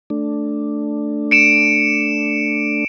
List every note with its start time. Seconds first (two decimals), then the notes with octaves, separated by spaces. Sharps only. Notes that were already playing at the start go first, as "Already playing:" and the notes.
0.10 A3 D4
1.31 C#7 D7 E7